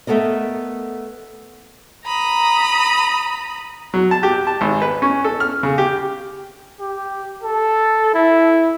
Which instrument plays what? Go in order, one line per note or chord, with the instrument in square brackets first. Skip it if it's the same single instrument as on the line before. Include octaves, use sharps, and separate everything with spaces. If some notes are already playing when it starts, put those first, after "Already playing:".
[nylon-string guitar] A3 B3 A4 A#4 D#5
[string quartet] A#5 B5 D#6
[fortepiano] F#3
A5
G4
A5
G#1
B4
C#4
A4
F6
C#3
G4
[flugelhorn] G4
A4
E4